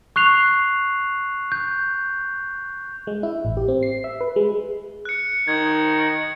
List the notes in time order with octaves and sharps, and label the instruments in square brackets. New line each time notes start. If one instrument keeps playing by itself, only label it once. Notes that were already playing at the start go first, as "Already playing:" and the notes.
[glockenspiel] C#6 F#6 C7 F7
G6
[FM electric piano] G#3
E4
A1
G4
C4
C7
E5
B4
G#3
[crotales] F#6 C#7
[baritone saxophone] D#3 [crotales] G#6